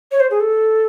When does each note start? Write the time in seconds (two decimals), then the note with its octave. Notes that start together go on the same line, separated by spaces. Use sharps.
0.12 C#5
0.20 C5
0.31 G#4
0.40 A4